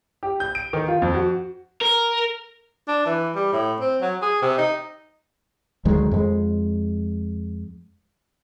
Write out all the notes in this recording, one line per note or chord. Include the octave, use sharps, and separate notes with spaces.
G4
G6
D7
D#3
F4
F2
F#4
A#4
D4
E3
G3
A2
C4
F#3
G#4
C3
D#4
D2 D#3 F#3 G#3
F2 G#3